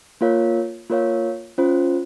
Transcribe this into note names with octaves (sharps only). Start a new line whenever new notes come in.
A#3 F4 A#4 C#5 F5
A#3 F4 A#4 C#5 F5
C#4 F4 C5